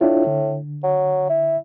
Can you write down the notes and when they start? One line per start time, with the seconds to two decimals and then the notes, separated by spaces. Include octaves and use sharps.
0.01 A2 D4 E4 F4
0.27 D3
0.84 F#3
1.29 E4